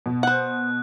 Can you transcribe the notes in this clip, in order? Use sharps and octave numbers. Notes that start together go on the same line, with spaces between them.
B2
C5 F#5 F#6